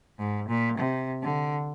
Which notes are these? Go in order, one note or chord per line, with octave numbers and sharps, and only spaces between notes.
G#2
A#2
C3
D3